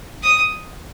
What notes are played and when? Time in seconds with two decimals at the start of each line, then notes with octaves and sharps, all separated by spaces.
0.23 D#6